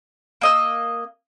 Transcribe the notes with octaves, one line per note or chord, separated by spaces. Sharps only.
A#3 D#5 E6